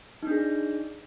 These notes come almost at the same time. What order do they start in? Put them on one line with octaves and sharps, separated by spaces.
D#4 D4 G#4